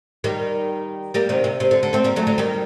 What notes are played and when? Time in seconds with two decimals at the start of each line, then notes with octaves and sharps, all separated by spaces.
0.24 D#3 G3
1.14 G3 A#3
1.29 C3 D#3
1.44 C3
1.60 C3
1.71 D3
1.83 D3
1.93 A3 C4
2.04 G3 A#3
2.16 F#3 A3
2.27 D3 F#3
2.38 D#3 G3